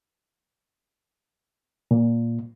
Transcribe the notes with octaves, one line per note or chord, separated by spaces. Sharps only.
A#2